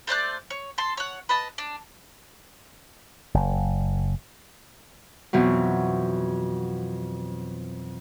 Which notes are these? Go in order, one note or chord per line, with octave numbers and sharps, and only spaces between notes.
A3 C5 D5 F#6
C#5
A4 C6
C#5 F#5
B4 D#5 A5
D4
F#1
F2 B2 E3 F#3